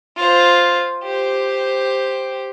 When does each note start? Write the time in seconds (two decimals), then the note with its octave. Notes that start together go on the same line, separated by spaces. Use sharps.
0.17 F4 C5
1.03 G4 C5